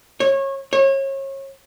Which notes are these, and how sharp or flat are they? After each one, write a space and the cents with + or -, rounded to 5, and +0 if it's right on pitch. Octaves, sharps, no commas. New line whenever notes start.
C#5 -25
C#5 -30